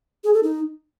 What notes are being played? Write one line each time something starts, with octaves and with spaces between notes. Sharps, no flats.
G#4
A4
D#4